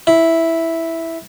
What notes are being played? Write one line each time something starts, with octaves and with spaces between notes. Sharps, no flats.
E4